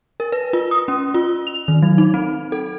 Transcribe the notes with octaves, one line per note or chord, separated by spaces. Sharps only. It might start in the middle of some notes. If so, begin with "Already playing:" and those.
A#4
B4
F4
D#6
C#4
F4
F7
D#3
F#3
D#4
C4
A4